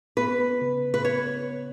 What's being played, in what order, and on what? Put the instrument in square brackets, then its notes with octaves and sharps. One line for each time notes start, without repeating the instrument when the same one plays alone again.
[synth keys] B3 [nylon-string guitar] B4
[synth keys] C#3
[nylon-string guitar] B4
[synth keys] B3 [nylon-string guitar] C#5
[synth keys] B3